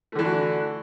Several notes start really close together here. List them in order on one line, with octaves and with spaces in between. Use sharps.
A3 D3 E3 D4 F#4